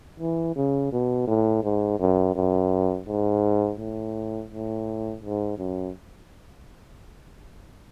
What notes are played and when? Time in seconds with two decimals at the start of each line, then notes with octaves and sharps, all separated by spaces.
0.20 E3
0.56 C#3
0.92 B2
1.27 A2
1.63 G#2
2.00 F#2
2.35 F#2
3.08 G#2
3.80 A2
4.51 A2
5.23 G#2
5.58 F#2